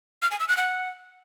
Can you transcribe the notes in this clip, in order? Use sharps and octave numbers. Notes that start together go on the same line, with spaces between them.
F6
G#5
E6
F#6
F#5